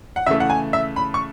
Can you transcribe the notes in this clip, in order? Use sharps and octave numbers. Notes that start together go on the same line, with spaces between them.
F#5
C#3 E3 A3 E5
F#5
G#5
E5
B5
C#6